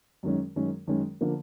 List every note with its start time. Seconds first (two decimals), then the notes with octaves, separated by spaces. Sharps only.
0.23 F#2 D#3 G#3 C#4
0.56 F#2 D#3 G#3 C#4
0.87 F#2 D#3 G#3 C#4
1.21 D3 F3 A#3